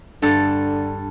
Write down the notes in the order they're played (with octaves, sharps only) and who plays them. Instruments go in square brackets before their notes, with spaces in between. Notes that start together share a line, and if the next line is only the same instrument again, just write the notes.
[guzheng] G2 A4 [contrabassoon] D3